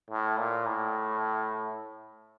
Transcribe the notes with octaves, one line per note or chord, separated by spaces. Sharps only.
A2
A#2
A2